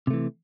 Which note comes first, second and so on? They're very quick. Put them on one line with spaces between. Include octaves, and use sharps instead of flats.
C3 A3 E3